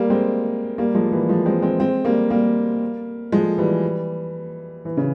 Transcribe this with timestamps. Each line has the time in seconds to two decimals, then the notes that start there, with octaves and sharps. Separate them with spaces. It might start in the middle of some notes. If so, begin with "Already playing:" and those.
Already playing: G3 A#3
0.10 G#3 C4
0.78 G3 A#3
0.94 F3 G#3
1.12 E3 G3
1.29 F3 G#3
1.45 G#3 C4
1.62 G#3 C4
1.80 G#3 C4
2.05 G3 A#3
2.30 G3 A#3
3.32 F3 G#3
3.58 E3 G3
4.85 E3
4.97 C#3